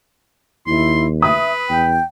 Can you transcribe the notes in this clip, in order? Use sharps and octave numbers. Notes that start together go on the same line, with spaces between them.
D#2 E4 C6
B4 E5 D#6
E2 G5